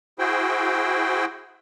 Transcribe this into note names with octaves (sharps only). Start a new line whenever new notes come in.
E4 F#4 G#4 C5 G5